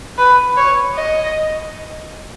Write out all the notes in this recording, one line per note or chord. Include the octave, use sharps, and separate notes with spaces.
B4
C#5
D#5